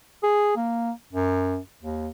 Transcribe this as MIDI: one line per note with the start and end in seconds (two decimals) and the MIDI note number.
0.23 0.56 68
0.56 0.91 58
1.13 1.58 42
1.82 2.08 39